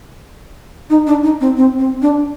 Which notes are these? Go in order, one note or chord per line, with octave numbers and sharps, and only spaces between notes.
D#4
D4
D#4
C4
C4
C4
D4